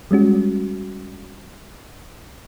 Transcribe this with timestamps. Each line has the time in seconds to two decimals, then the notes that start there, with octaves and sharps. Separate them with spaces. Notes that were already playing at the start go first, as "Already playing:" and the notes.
0.11 G3 G#3 C#4 F#4